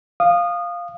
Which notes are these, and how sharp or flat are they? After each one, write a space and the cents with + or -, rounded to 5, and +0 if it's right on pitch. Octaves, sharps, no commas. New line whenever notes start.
F5 +0 D#6 -25